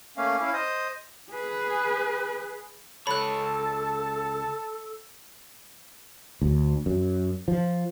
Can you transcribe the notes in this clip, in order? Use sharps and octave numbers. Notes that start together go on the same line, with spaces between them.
A3 A#3 C#4 F5
C#4 E4 F5
C5 D#5 D#6
G#4 B4
C#2 A4 C#5 A5 B5 F#6
D2
F#2
F3